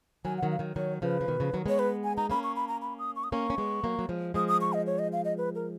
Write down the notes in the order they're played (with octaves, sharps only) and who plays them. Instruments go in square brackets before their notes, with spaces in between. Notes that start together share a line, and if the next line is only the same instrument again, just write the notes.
[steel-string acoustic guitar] D#3 F#3 [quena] G#5
[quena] F#5
[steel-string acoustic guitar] D#3 F#3
[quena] F5
[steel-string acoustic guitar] D#3 F#3
[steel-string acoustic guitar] D#3 F#3 [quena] C#5
[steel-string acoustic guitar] C#3 F3 [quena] B4
[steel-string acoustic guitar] F3
B2 D#3
C#3 F3
D#3 F#3
[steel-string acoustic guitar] G#3 B3 [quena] C#5
[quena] B4
G#5
[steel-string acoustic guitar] D#4 [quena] A#5
[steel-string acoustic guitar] A#3 C#4 [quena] B5
[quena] C#6
B5
A#5
B5
D#6
C#6
D#6
[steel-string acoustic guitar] A#3 C#4 [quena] C#6
[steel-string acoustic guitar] C#4
G#3 B3
F#3 A#3
F#3
F3 G#3
[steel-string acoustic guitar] F3 G#3 [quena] D#6
[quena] D#6
C#6
D#5
C#5
D#5
F5
D#5
B4
A#4